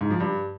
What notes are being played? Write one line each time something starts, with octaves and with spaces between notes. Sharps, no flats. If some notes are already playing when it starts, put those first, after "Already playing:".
G#2
F3
G2